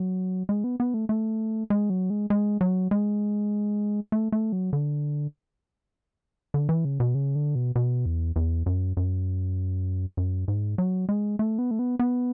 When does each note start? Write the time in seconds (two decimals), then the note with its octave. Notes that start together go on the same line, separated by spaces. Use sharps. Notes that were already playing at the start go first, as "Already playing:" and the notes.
Already playing: F#3
0.49 G#3
0.64 B3
0.80 B3
0.94 A3
1.09 A3
1.70 G#3
1.90 F#3
2.10 G#3
2.30 G#3
2.61 F#3
2.91 G#3
4.12 A3
4.32 A3
4.52 F#3
4.73 D3
6.54 D3
6.69 E3
6.85 C#3
7.00 B2
7.15 C#3
7.35 D3
7.55 B2
7.76 B2
8.06 E2
8.36 E2
8.66 F#2
8.97 F#2
10.17 F#2
10.48 G#2
10.78 F#3
11.09 G#3
11.39 A3
11.59 B3
11.71 A3
11.79 B3
11.99 B3